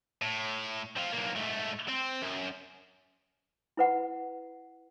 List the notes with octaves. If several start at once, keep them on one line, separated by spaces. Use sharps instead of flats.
A2
C4 F4
B1 A#3
G#2 A3
C4
F#2
E4 B4 F#5